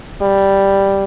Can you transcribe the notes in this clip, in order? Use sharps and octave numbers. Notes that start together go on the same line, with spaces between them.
G3